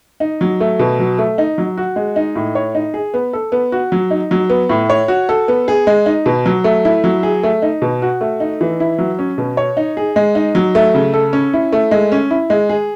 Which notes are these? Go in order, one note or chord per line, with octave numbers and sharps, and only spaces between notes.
D#4
F#3
A3
B2
F#3
A3
D#4
F#3
F#4
G#3
D#4
A2
C#5
D#4
G#4
B3
A4
B3
F#4
F#3
D#4
F#3
B3
A2
C#5
F#4
A4
B3
G#4
G#3
D#4
B2
F#3
A3
E4
F#3
G#4
A3
D#4
B2
F#4
A3
D#4
E3
E4
F#3
C#4
B2
C#5
D#4
G#4
G#3
D#4
F#3
A3
C#3
A4
C#4
E4
A3
G#3
C#4
E4
G#3
G#4